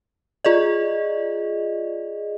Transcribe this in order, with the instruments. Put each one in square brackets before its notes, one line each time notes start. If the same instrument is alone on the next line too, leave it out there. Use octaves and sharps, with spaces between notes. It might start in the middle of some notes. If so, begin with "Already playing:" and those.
[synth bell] F4 G#4 D5 D#5